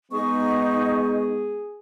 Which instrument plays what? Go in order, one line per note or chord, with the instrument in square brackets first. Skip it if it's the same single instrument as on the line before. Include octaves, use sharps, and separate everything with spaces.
[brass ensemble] G#3 B3 [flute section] D#4 D#5 [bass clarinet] G#4 [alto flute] C#6